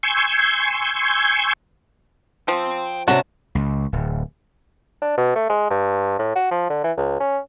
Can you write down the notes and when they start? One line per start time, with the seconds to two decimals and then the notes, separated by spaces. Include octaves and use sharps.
0.03 G#5 C6 C#6 E6 G6 G#6
2.48 F3 G5 C6
3.08 C3 C#4 F#4 D5 A5
3.55 C#2
3.93 D1
5.02 D4
5.18 B2
5.36 A3
5.49 G#3
5.71 G2
6.19 A2
6.35 F#4
6.51 F3
6.70 D3
6.84 E3
6.97 C#2
7.20 C#4